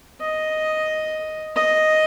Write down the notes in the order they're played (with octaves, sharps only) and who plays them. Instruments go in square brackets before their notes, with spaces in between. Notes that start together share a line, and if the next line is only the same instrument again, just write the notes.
[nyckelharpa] D#5
D#5